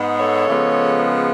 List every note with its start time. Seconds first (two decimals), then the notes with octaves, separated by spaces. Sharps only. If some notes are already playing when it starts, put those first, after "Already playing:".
Already playing: G#2 G#3 B3
0.18 A4 C#5
0.48 C#3 F3 G#3 B3